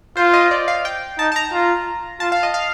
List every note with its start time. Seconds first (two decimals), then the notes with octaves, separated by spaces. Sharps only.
0.17 F4 C5
0.34 D#5
0.51 D5
0.68 F5
0.85 G5
1.19 D#4 A5
1.32 A5
1.36 A#5
1.53 F4
2.20 F4 A5
2.32 F5
2.43 D#5
2.54 F5